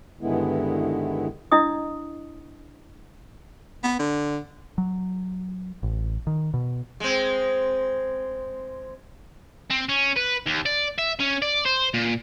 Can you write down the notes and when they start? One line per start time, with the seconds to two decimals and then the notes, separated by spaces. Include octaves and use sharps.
0.21 G2 D3 D#3 G#3 B3 E4
1.52 D4 E4 D#5 D#6
3.83 B3
3.99 D3
4.78 F#3
5.83 A1
6.27 D#3
6.54 B2
7.00 G#3 C4
9.71 C4
9.89 C#4
10.16 B4
10.46 D#2
10.66 D5
10.99 E5
11.20 C#4
11.42 D5
11.65 C5
11.94 A#2